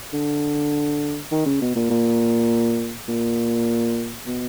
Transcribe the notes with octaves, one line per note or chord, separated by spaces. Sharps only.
D3
D#3
C#3
B2
A#2
A#2
A#2
B2